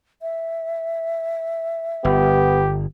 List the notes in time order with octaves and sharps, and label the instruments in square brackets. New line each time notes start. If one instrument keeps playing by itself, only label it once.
[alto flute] E5
[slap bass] G1 [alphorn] B3 [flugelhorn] G4